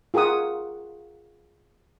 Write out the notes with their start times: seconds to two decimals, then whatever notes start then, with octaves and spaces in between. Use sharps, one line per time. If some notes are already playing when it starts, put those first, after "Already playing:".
0.14 F4 G#4 A#4 F#5 D#6